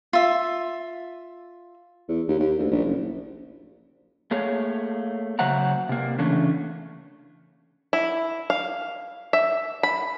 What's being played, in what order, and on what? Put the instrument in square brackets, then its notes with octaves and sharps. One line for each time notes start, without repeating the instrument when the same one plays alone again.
[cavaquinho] F4 E5
[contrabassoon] E2
D#2
D#2
D2
A#1
F#1
[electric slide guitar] A3 A#3 G#4 C#5
C#3 F#3 C5 E5 F#5 A#5
C3 A#3
C#3 E3 A3 C#4 D4
[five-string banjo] E4
F5
E5
B5